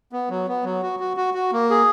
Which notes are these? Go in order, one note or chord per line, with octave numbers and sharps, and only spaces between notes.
B3
F#3
B3
F#3
F#4
F#4
F#4
F#4
A#3
G#4